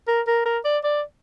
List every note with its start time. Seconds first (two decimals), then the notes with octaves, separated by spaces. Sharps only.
0.08 A#4
0.27 A#4
0.46 A#4
0.65 D5
0.84 D5